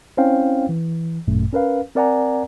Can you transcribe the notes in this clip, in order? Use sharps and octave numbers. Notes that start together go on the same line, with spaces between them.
C4 C#4 E4 C5 F5 G5
E3
G#1 F#2 A#2 A3
C#4 A#4 B4 F5
C4 A#4 D5 F#5 G#5 A#5